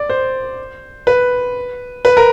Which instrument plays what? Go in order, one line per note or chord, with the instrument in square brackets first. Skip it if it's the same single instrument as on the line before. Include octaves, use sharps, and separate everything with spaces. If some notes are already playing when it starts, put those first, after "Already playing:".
Already playing: [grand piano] D5
C5
B4
B4
A#4